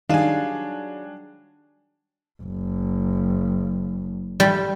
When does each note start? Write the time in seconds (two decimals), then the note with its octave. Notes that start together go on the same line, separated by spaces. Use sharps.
0.09 D#3 F#3 G3 D4 D#4 G#4 F5 G#5
2.42 F#1
4.40 G3